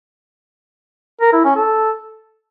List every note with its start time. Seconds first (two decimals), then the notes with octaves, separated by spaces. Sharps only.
1.21 A#4
1.33 E4
1.44 C#4
1.56 A4